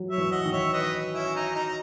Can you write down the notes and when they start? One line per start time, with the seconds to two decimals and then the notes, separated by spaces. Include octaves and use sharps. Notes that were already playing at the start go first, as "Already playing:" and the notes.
Already playing: E3 F#3
0.11 C#5 E5
0.18 E3
0.32 D#5 F#5
0.45 D#3
0.52 C#5 E5
0.73 B4 D#5
1.15 C#4 E4
1.36 D#4
1.55 D#4